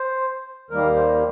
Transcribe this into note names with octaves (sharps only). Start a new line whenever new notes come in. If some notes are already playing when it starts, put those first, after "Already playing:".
Already playing: C5
D#2 D#3 G3 A#3 A#4
C5